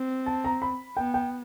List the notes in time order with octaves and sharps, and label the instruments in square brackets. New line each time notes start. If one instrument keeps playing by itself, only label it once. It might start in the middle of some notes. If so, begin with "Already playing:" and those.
Already playing: [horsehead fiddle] C4
[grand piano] A5
A#5
B5
[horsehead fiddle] B3 [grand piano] G5
[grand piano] G5